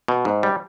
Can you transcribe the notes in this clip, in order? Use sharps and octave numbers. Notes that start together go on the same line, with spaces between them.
B2
G#2
G3